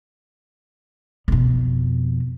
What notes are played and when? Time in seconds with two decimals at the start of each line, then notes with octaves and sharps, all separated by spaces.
1.28 F2 B2